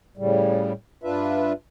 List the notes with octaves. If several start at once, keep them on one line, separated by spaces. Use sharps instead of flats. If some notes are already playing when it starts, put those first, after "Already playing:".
A2 C#3 G3
G2 D4 F4 B4 E5